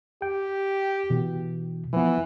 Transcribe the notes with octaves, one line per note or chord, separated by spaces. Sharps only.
G4 G5
B2 E3
E3 F3 B3